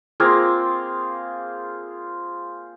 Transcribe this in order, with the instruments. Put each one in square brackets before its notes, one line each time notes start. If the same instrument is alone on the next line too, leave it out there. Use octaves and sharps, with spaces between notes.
[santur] A#3 C4 F4 G#4